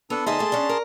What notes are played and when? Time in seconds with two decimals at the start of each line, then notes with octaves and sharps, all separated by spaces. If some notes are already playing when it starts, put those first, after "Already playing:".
0.10 B3 D4 A4
0.26 D2 D#4 G#4 E5 A5 C6
0.39 G#3 A3
0.52 C#4 D4
0.69 A#4